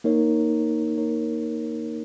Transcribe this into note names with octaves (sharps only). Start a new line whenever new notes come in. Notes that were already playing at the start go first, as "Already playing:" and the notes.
A#3 D#4 A#4 C#5
A#3 D#4 A#4 C#5